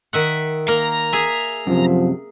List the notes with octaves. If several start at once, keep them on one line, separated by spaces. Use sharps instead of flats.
D#3 E5 F#5
A#3 A#5
G#4 E5
F#2 C3 F3